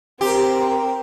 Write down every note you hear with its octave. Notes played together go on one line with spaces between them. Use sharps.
C4 G4 A#4